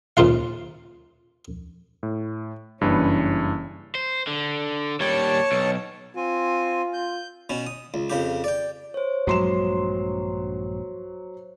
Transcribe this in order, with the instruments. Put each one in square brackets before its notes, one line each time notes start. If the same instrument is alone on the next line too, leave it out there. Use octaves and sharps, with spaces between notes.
[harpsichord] D#2 A#2 C#3 F4 F5
[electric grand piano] A2
[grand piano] F#1 E3 B4 [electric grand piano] G2 [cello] C#4
[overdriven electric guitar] C5
D3
[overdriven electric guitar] D#2 G3 [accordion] C#5 A5
[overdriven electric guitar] B1
[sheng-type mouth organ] C4 G#5 [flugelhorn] F4
[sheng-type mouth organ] G6
[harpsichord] B2 C#4
D#6
C#2
F2 C#3 G4
D5 G5
[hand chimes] C5 C#5
[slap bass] A#1 G2 G#3 [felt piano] F#3 C6 E7